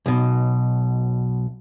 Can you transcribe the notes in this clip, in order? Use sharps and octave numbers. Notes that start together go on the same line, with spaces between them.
B1 B2